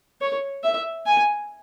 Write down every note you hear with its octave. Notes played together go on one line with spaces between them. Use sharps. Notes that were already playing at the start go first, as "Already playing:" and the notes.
C#5
E5
G#5